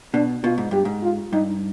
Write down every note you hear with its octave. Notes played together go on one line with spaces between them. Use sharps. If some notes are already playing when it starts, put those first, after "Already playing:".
B2 D4
B2 F4
G#2
G2 G4
G#2
F4
G2 D#4